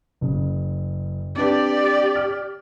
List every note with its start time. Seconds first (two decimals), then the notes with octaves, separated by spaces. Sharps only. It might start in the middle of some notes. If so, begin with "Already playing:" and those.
0.21 F#1 C#3
1.36 C4 D4 G4 B4 D5
2.16 F6